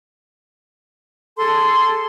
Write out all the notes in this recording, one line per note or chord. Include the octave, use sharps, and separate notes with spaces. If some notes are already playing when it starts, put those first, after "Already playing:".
G#4 A4 A5 C6